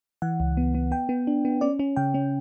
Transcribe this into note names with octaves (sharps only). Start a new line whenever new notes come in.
E3 F#5
C#2
B3
B3
B3 G5
B3
D4
B3
C#4 D5
C#4
C#3 G5
C#4